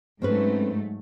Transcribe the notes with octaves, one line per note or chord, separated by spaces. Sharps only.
G#2 F#3 A3 C4 C#4 B4